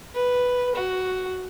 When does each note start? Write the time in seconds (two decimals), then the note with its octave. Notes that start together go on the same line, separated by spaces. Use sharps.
0.15 B4
0.75 F#4